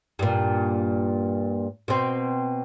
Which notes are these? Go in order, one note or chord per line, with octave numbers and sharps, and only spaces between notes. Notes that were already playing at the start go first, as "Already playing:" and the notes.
G2 A#2
B2 C4